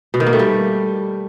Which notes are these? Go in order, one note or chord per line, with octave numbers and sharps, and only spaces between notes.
B2
D#3
A#3
A3
G3